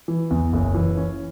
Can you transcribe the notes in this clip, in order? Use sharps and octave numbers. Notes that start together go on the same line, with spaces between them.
E3
E2
F#1
E3
C#4